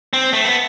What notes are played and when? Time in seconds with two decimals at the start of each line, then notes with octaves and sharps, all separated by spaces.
0.13 C4
0.33 A3
0.45 B3